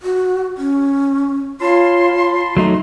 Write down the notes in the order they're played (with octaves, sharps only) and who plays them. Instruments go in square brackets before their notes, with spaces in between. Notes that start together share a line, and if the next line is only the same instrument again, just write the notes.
[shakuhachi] F#4
C#4
[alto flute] F4 [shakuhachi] C#5 [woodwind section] A5 B5 C6
[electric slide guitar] F#3 A3 D#4